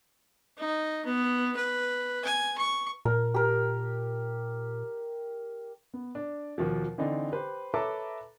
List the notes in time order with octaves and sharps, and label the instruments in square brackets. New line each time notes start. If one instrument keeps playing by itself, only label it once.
[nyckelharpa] D#4
B3
B4
G#5
C#6
[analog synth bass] A#2 [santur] A#4
[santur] G4 A#4
[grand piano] B3
D4
D#2 B2 F3
D3 E3 C4 D4 D#4
G4 B4 C5
A4 B4 C#5 E5 A#5 D6